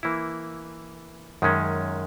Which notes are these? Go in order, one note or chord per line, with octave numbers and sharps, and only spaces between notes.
E3 A#3 E4
F#2 D#3 G#3 C#4